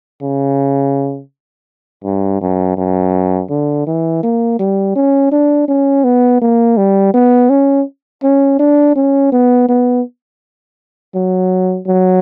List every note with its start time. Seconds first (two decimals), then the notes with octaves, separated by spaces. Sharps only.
0.22 C#3
2.04 G2
2.41 F#2
2.77 F#2
3.50 D3
3.87 E3
4.23 A#3
4.59 G3
4.96 C#4
5.32 D4
5.68 C#4
6.04 B3
6.42 A#3
6.77 G3
7.14 B3
7.50 C#4
8.23 C#4
8.59 D4
8.96 C#4
9.32 B3
9.69 B3
11.15 F#3
11.87 F#3